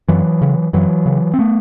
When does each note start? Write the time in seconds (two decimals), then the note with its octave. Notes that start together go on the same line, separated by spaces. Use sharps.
0.08 F#2 E3 F#3
0.42 C#3
0.73 F#2 E3 F#3
1.06 C#3
1.34 C4
1.39 A3 B3